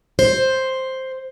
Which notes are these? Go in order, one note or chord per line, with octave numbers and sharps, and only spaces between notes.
C5